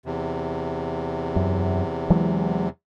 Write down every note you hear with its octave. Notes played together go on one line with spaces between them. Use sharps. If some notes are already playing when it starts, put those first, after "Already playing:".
E2 C3
F#2
E3 F#3 G#3